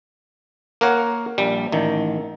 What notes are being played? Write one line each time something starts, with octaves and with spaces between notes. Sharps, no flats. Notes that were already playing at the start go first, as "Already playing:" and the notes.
A#3 A#4 C#5 F#5
A#1 G3
A1 D#3